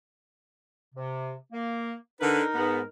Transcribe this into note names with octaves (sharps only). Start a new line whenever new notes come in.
C3
A#3
D3 D#4 A#4 B4
G#2 B3